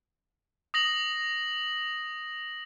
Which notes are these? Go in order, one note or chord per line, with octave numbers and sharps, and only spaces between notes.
D#6 A#6 F#7